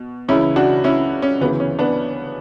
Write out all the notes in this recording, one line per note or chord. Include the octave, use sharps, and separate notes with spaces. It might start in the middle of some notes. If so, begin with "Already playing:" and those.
Already playing: B2
C#2 C#3 E3 C#4 E4
D4 F#4
C#4 E4
C#4
D2 C#3 E3 B3
C#4
B3 D4